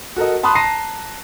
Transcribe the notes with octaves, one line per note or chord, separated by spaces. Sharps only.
F#4 A4 A#4 D#5
A5 B5 C6 D#6 F#6
A5 A#5 A#6 C7 D#7